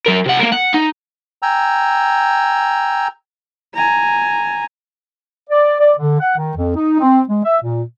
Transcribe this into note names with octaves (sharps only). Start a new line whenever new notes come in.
F#3 A#4
C3 F#5
A#3 A#4
F#5
D#4
G5 G#5 A#5 E6
G#5 A#5
D5
D5
D3
F#5
D#3
F2
D#4
C4
G#3
E5
A#2